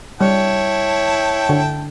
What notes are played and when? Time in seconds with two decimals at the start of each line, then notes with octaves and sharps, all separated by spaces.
0.21 G3 E4 C#5 G5 A5
1.49 D3